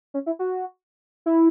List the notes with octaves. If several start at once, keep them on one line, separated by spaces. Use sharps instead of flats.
C#4
E4
F#4
E4